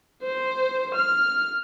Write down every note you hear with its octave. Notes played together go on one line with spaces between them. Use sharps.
C5
F6